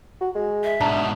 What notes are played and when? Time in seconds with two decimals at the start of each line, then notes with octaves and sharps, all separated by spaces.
0.21 F#4
0.35 G#3
0.64 E5
0.81 G#2 B2 D4 A5 A#5